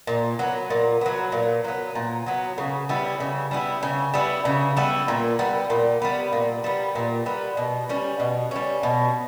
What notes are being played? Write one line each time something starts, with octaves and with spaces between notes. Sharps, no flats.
A#2
F#3 B3
A#2
F#3 B3
A#2
F#3 B3
A#2
F#3 B3
C#3
G3 B3 E4
C#3
G3 B3 E4
C#3
G3 B3 E4
C#3
G3 B3 E4
A#2
G3 B3
A#2
G3 B3
A#2
G3 B3
A#2
G3 B3
B2
G3 C#4
B2
G3 C#4
B2